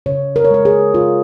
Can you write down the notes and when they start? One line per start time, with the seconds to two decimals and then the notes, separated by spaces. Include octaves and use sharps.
0.06 C#3 C#5
0.36 A#4
0.45 C#5
0.51 G#3 A#4
0.65 G#4
0.94 C#3 F4